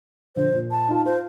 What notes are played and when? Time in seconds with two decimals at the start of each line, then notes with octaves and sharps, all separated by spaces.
0.36 D3 F3 C5
0.53 A#2
0.71 A5
0.88 D#4 F4
1.06 F4 C5